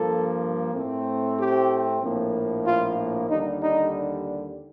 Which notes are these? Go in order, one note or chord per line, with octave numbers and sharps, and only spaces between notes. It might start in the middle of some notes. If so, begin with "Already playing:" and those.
Already playing: G2 F3 A#3 A4
A2 A3 C4
G4
A#1 A2 F3 A#3
F4
D#2 D3 G3 D#4
D#4